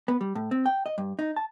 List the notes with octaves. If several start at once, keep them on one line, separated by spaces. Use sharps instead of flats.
B3
G3
A2
C4
G5
D#5
G2
D#4
A5